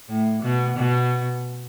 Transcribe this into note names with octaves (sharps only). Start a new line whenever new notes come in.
A2
B2
B2